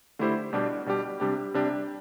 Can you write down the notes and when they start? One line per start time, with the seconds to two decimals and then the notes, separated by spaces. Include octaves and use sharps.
0.19 D3 A3 E4 G4 C5
0.53 B2 G3 D4 G4
0.86 B2 G3 D4 G4
1.20 C3 G3 D4 G4
1.54 C3 G3 D4 G4